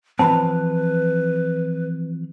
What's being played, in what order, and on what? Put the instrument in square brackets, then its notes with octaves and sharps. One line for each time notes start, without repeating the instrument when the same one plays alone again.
[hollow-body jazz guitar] E3 F3 C4 [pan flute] B4 [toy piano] A5 B5